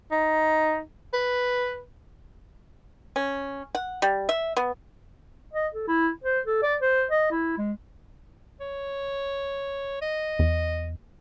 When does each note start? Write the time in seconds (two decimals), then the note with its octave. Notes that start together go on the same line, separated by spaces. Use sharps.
0.11 D#4
1.13 B4
3.16 C#4
3.75 F#5
4.02 G3
4.29 E5
4.57 B3
5.53 D#5
5.74 A4
5.88 E4
6.24 C5
6.46 A4
6.63 D5
6.82 C5
7.11 D#5
7.31 E4
7.58 G#3
8.61 C#5
10.02 D#5
10.39 E2